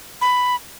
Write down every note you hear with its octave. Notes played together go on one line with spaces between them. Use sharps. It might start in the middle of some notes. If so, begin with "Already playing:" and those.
B5